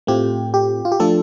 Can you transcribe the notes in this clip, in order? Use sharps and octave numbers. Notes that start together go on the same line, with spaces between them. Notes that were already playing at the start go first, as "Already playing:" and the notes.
A2 A3 C4 F4 G4
G4
F4
G4
F3 A3 D4 F4 A4